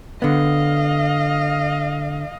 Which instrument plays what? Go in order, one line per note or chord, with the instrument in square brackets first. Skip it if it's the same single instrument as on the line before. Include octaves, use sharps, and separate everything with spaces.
[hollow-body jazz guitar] D3 B3 [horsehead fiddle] D#5 F5